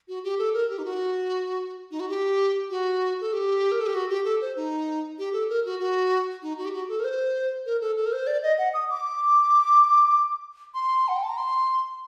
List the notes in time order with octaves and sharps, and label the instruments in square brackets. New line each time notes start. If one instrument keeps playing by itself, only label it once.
[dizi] F#4
G4
A4
A#4
G4
D#4
F#4
D#4
F#4
G4
F#4
A4
G4
A#4
A4
G4
F#4
G4
A4
C5
D#4
G4
A4
A#4
F#4
F#4
D#4
F#4
G4
F#4
A4
A#4
C5
A#4
A4
A4
A#4
C5
D5
D#5
F#5
D#6
D6
C6
F#5
G5
A5
A#5
C6